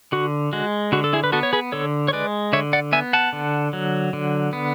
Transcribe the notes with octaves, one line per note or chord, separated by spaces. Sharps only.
D3 F#4
G#3 F#4
D3 F#4
A4
E4 G#4
B4
B3 F#4 A4
C#5
G#4 B4
D3 A4 C#5
C#5
G#3 B4 D5
D3 C#5 E5
D5 F#5
B3 E5 G#5
F#5 A5
D3
F#3
D3
B3